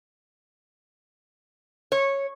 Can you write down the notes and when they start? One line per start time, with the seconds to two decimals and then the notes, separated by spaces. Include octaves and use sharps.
1.92 C#5